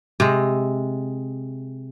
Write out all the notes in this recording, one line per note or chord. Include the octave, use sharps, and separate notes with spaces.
C3 G#3